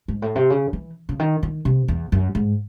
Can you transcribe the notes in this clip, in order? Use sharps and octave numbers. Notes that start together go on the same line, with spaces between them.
G#2
A2
C3
C#3
E3
C#3
D#3
D#3
C3
E2
F#2
G#2